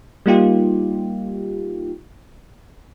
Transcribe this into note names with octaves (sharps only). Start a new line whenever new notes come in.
G3 A#3 D#4 F4 G4